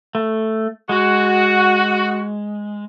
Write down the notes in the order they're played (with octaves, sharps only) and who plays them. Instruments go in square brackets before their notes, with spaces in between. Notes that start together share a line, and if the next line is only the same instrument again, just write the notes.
[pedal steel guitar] A3
[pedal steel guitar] G#3 [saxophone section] F#4